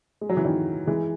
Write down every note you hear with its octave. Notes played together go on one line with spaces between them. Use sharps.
G#3
F#3
E3
D#3 F#3
E3 G#3